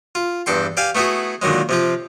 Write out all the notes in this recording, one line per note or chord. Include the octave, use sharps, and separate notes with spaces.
F4
E2 G2 A4 G5 C6
G4 D5 F5 G#5
A3 B3 E4 F#4 G#4
A#2 D3 D#3 F#3 G#3
C3 F3 F4